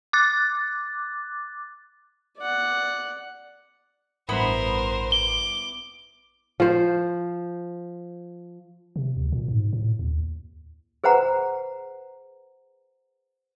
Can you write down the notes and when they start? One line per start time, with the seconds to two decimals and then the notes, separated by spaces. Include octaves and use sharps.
0.13 D6 F#6 A6
2.38 D5 F#5
4.29 A1 G2 B3 E4 A#4 C5 B5
5.12 D6 G7
6.60 F3 C5
8.96 C3
9.17 D2
9.32 A#2
9.48 G#2
9.73 A2
9.99 D#2
11.04 G#4 B4 C5 F#5 A#5